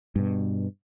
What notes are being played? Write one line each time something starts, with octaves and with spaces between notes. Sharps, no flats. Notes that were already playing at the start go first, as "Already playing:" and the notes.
G2 B2